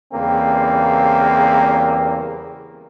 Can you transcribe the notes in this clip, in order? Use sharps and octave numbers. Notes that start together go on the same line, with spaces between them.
E2 C#3 G3 A#3 C4